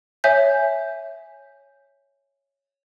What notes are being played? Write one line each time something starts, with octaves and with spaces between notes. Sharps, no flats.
C#5 E5 G#5 G6